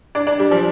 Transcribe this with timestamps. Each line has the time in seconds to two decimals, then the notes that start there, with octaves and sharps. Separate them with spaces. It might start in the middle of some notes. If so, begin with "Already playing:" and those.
0.15 D4
0.27 D4
0.39 G3
0.51 F3